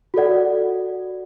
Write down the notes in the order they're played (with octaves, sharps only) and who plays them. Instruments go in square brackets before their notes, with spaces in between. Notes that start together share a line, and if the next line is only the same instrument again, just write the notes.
[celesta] F#4 A4 D5 F#5